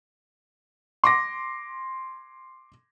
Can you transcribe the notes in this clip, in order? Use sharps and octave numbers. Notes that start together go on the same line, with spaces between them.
C6 D6 A#6